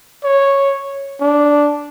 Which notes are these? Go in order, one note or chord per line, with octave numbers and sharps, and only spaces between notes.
C#5
D4